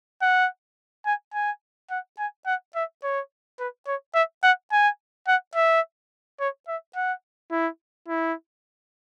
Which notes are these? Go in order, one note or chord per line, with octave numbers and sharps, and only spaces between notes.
F#5
G#5
G#5
F#5
G#5
F#5
E5
C#5
B4
C#5
E5
F#5
G#5
F#5
E5
C#5
E5
F#5
E4
E4